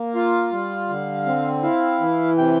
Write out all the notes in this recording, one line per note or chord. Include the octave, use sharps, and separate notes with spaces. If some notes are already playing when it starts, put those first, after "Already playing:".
Already playing: A#3
F4 F5
G3
D3
C4
E4 F5
E3
C3 G5